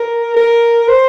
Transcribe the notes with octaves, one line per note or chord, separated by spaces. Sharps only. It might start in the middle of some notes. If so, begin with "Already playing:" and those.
Already playing: A#4
A#4
C5